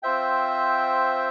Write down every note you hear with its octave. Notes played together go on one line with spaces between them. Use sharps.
C4 F4 C5 E5 G5